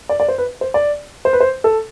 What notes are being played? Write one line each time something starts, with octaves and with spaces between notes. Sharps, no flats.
D5
D5
C5
B4
C5
D5
C5
B4
C5
A4